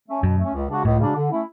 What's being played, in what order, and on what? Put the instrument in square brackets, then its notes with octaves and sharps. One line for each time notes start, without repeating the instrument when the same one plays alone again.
[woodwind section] A3 C#4
[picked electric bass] F#2 [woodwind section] B2
[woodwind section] A3 C#4
C#2
C#3 G#3 D4 F#4
[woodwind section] C#2 [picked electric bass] A2
[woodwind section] C#3 G#3 D4 F#4
D3
A3 C#4 E4